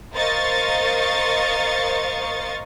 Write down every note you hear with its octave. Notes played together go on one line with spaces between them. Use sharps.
A#4 C5 D#5 F5 C#6 A6